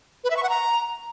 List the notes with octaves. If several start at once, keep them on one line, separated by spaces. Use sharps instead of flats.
B4
E5
C#6
F#5
A#5